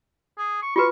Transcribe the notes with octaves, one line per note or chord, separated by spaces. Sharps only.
G#4
C#6
F4 F#4 B4 C#6